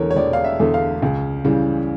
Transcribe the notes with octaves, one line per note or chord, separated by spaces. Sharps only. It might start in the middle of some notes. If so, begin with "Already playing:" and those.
Already playing: E1 E2 D3 A3 A#4 C#5
C#5
E1 D5
F5
E5
E2 D3 A3
F5
C#2
C#3 E3 G3